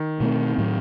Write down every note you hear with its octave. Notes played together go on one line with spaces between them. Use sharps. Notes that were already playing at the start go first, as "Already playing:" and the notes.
Already playing: D#3
B2 A3 C4
A2 F#3 C4